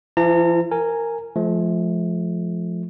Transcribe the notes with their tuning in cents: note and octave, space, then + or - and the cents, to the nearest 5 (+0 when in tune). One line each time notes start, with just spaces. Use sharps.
F3 -45 E4 +0 A#5 -40
A#4 -15 G#5 +0
F3 +0 A3 -35